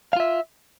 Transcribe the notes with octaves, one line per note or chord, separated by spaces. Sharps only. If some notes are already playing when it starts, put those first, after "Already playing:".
F4 E5 F5